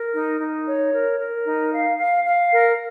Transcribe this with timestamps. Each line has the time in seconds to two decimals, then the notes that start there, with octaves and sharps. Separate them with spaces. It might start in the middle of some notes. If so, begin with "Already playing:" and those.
Already playing: A#4
0.14 D#4
0.40 D#4
0.67 C#5
0.93 A#4
1.20 A#4
1.46 D#4
1.73 F5
1.99 F5
2.25 F5
2.51 A#4